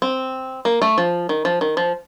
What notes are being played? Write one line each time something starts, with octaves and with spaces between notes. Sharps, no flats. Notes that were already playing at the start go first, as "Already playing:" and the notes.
C4
A#3
A3
F3
D#3
F3
D#3
F3